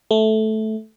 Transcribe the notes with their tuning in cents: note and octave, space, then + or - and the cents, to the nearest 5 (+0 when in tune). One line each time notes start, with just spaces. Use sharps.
A3 -10